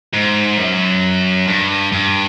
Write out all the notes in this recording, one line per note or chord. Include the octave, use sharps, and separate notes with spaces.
G#2
F#2
G2
G2